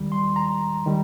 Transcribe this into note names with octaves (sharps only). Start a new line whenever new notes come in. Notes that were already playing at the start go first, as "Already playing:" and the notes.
Already playing: D#2 D#3 G3
C6
A#5
D#3 G3